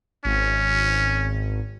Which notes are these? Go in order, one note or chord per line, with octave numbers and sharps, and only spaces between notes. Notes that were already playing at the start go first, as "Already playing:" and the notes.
G#1 C#4